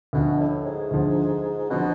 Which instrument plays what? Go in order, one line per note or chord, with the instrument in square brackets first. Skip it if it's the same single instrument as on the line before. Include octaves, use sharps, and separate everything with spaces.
[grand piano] D2 D3 F3 [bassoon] B2
[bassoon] A2
G#2
[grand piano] D2 D3 F3
[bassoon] B2 [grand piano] D3 F3